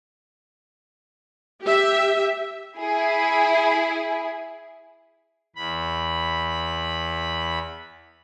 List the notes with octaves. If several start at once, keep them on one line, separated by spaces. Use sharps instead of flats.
G4 E5
E4 G#4
E2 B5